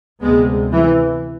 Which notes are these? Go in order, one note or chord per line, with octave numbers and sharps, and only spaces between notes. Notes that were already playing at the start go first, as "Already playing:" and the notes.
D2 C3 G#3 B3
E3